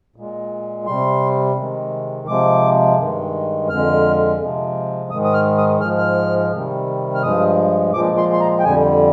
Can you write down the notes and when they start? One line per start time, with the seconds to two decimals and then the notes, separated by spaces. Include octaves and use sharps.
0.16 A#2 G#3
0.86 C3 G3 C6
1.57 C3 D#3 G#3
2.28 C3 F3 G#3 D6
2.99 G2 D#3 G#3
3.69 F2 D3 G#3 F6
4.39 C3 F3 G#3
5.11 G#2 D#3 G#3 D#6
5.25 D#6
5.34 F6
5.58 D#6
5.81 G#2 F3 G#3 F6
5.97 F6
6.52 C3 D#3 G3
7.15 F6
7.22 G2 F3 G#3 D#6
7.93 A#2 F3 G#3 D6
8.17 C6
8.33 C6
8.40 A#5
8.59 G5
8.64 F2 D3 G3 G#5